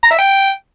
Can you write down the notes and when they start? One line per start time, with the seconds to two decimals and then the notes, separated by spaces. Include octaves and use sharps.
0.03 A#5
0.11 E5
0.19 G5